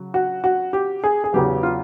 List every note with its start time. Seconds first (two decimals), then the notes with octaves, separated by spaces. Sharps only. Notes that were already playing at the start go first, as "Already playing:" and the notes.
Already playing: C#3 F#3
0.14 F#4
0.44 F#4
0.73 G4
1.04 G#4
1.24 G#4
1.33 E2 C#3 F#3 B3 G4
1.63 F4